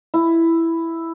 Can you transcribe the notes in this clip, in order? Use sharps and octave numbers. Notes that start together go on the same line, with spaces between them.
E4